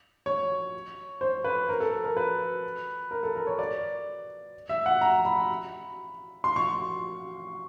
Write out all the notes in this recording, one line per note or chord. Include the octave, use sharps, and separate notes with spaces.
C#5
C5
B4
A#4
A4
A#4
B4
A#4
A4
A#4
C#5
D5
E5
F#5
A#5
B5
C6
C#6